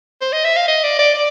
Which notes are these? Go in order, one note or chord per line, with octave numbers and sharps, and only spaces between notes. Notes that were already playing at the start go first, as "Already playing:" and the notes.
C5
D#5
E5
F5
D#5
D5
D5
D5